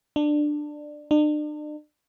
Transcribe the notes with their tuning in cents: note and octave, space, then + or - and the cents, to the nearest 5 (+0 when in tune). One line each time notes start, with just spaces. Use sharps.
D4 +15
D4 +40